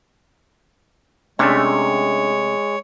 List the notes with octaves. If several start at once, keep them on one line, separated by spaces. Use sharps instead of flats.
C3 G#3 A3 C#4 D4 C#5